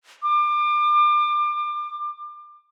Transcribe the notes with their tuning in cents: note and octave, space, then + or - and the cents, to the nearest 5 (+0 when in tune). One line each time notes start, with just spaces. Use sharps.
D6 +30